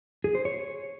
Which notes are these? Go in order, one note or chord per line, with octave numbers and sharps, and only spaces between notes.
G#4
C5
C#5